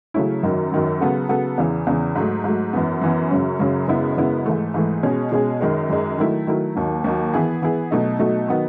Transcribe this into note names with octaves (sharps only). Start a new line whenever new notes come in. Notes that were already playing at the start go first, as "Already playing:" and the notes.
C#3 F#3 A3 C#4 E4
F#2 D#3 F#3
F#2 D#3 F#3
C#3 F#3 B3 F#4 A4
C#3 F#3 B3 F#4 A4
E2 C#3 E3
E2 C#3 E3
G#2 F#3 A3
G#2 F#3 A3
F#2 E3 B3
F#2 E3 B3
F#2 C#3 F#3 C#4
F#2 C#3 F#3 C#4
F#2 C#3 G#3 B3 E4
F#2 C#3 G#3 B3 E4
G#2 E3 A3
G#2 E3 A3
B2 G#3 C#4 G#4
B2 G#3 C#4 G#4
F#2 D#3 G#3
F#2 D#3 G#3
D#3 F#3 A3 E4
D#3 F#3 A3 E4
D#2 D#3 F#3
D#2 D#3 F#3
E3 B3 E4 G#4
E3 B3 E4 G#4
B2 F#3 A3 D#4
B2 F#3 A3 D#4
D#3 F#3 B3 D#4